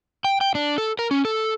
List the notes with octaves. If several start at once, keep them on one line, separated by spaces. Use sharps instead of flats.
G5
G5
D4
A4
A#4
C#4
A4